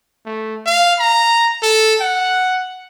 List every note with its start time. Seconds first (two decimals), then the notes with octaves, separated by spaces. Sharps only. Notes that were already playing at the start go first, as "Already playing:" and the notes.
0.26 A3
0.66 F5
0.99 A#5
1.62 A4
2.00 F#5